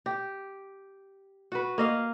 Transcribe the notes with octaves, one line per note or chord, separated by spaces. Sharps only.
G4
F#4 B4
A#3 D#5 F5